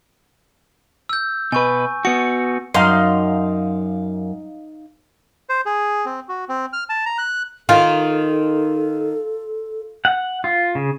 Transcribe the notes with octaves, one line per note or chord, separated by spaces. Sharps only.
E6 G6
B2 B4 G#5 C#6
B3 F#4 C#7
F#2 D#4 F5 C6
C5
G#4
C4
F#4
C4
F6
A5
A#5
F#6
D#3 F4 A4
F#5
F4
C#3